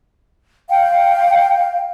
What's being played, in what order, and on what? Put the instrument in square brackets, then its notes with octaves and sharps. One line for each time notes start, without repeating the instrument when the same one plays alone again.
[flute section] F5 G5